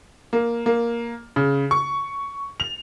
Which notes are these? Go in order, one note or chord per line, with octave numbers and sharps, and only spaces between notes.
A#3
A#3
C#3
C#6
F7